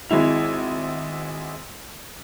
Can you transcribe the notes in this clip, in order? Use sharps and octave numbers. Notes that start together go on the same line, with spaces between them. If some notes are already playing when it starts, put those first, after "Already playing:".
G#1 G#3 E4 F7